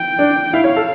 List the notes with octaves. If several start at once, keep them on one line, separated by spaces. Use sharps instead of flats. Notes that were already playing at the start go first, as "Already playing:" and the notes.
Already playing: G5
D4
E4 F5
C#5
A4